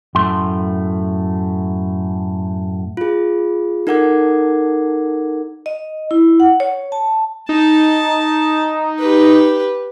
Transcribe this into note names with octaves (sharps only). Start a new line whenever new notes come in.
F#2 A2 A3 C6
F4 G#4
D#4 A4 A#4 F#5 D6 G#6
D#5
E4
F#5
C#5
A5
D#4 A5
G4 B4